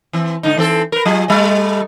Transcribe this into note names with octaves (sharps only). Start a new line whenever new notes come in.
E3 C4
G#2 D3 D#4
E3 C4 A4
A#4 B4
F#3 F4 G#4
G3 A3 D#5